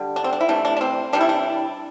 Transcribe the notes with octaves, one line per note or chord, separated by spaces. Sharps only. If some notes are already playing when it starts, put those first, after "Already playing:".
Already playing: D3 G3
D4
C4
D4
E4
C3 E3 A3 D4
D4
D4
C4
C3 E3 G3 D4
E4
D4